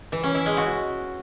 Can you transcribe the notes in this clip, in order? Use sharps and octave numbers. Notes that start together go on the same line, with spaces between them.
E3
C#4
E4
G#3
F#4